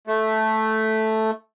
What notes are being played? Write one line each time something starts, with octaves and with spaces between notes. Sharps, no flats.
A3